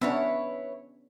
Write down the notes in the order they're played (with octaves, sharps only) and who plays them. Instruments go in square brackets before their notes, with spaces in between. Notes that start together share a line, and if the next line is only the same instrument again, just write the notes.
[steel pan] B3 C#4 D4 [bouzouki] E4 B4 C#5